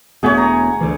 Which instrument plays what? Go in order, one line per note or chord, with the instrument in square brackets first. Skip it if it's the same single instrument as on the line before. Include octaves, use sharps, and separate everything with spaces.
[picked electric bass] E1 A3 B3 [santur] G#4 C#5
[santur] A#5
[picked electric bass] D2 E3